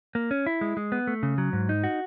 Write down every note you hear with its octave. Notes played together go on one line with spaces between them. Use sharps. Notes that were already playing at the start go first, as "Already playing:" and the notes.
A#3
C#4
E4
G#3
G#3
B3
A3
C#3
F#3
G#2
D#4
F#4